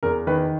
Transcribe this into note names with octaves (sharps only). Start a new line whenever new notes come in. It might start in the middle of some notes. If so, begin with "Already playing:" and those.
E2 A#4
D#3 B4